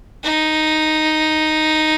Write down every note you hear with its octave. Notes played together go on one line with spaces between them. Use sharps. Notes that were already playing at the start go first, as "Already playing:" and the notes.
D#4